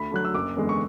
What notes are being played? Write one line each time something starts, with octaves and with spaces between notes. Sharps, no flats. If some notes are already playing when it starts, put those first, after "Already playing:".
Already playing: D2 B5
D3 F#3 F#6
E6
F#1 D6
E2 D3 G#3
C#6